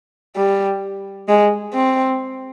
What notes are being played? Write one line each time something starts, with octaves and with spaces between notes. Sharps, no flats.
G3
G#3
C4